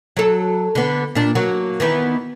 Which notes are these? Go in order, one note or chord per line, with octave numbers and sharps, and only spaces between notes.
F#3 A4
D3 B3
A#2 D4
F#3 A#3 F#4
D#3 E3 B3